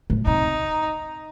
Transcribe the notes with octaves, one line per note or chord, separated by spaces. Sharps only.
A2
C3 D#4